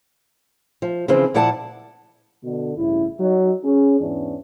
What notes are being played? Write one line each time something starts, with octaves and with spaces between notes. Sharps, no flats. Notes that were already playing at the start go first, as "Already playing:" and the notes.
F3
C#3 E3 F3 C4
A#2 F3 E4 D5 F#5 A5
B2 D3
A1 G2 C#3 E4
F#3 D#4
C#4 G#4
E2 G#2 E3 B3 C#4 D4